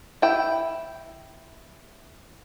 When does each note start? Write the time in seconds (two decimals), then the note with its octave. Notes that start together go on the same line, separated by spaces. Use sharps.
0.22 E4 G5